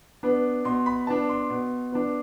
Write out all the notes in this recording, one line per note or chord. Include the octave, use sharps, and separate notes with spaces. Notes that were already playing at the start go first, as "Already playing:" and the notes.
B3 D4
B2 C6
B5
B3 D4 A5
C6
B2
B3 D4